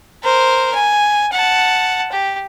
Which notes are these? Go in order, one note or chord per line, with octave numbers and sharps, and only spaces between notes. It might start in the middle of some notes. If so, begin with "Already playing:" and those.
A#4 C5
G#5
F#5 A5
G4